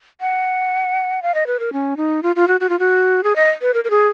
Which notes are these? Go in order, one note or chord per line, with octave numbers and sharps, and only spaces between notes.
F#5
F5
D#5
B4
A#4
C#4
D#4
F4
F4
F#4
F#4
F4
F#4
G#4
D#5
B4
A#4
A#4
G#4